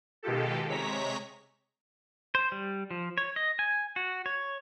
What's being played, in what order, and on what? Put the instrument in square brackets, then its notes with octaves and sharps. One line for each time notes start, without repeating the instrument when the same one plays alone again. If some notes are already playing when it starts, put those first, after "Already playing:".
[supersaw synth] B2 D#3 G#3 F4 G4 A4
C3 G#3 C#5 A#5 B6
[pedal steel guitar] C5
G3
F3
C#5
D#5
G#5
F#4
C#5